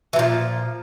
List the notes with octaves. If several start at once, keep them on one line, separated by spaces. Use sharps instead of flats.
A#2 E3 F3